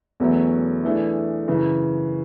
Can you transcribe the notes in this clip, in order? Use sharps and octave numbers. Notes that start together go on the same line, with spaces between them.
E2 B2 F#3 A3 C#4
E3 A3 D4 G#4
F#2 C#3 E3